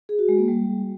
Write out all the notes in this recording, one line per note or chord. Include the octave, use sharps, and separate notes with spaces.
G#4
F#4
G#3
A#3
G3